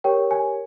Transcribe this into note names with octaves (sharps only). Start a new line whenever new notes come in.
G4 A#4 C#5 G5
G#5